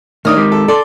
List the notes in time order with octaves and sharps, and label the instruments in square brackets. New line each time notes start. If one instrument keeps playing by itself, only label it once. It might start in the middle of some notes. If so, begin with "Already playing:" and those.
[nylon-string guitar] D#3 [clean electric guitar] A3 C#5 D5 [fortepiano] D#4 D#6 F6
[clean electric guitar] G#3 C4 G4
[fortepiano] A4
[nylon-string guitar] A4 [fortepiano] D5 C6